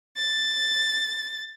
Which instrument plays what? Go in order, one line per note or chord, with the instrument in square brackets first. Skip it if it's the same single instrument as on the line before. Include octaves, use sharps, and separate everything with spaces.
[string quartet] A6